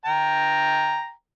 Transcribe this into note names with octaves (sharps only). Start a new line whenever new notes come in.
G5 A#5